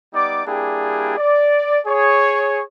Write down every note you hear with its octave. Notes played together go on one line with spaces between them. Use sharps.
G3 B3 D#4 D5 D6
G3 A#3 D4 E4 G4 G#4
D5
G#4 C#5